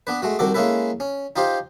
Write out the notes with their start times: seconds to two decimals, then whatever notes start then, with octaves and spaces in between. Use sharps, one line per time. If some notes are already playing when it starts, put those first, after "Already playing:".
0.07 B3 D4 B4
0.22 G#3 A3 F#4
0.39 C2 D#3 F#4 A4 D6
0.54 G#3 A#3 C#4 E4 A4 B4
1.00 C#4
1.36 D#4 F4 G4 C5